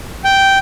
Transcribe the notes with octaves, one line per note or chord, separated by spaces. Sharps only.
G5